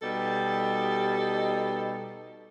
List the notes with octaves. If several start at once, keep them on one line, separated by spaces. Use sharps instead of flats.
B2 G3 D#4 G4 A4